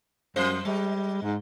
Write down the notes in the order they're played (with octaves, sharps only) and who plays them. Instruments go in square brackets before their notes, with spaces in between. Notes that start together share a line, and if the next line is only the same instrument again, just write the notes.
[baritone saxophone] F#2 [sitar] G3 C5
[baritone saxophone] G3 [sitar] G#3
[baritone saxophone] G#2